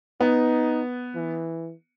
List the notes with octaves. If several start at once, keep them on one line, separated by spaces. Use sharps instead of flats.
B3 D#4
E3